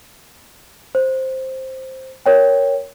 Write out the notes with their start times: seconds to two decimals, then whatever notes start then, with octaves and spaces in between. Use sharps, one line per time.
0.95 C5
2.26 A#4 C#5 G5